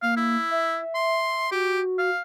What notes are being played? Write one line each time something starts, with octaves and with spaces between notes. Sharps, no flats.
A#3 F5
E4
E5
C6
F#4 G4
F5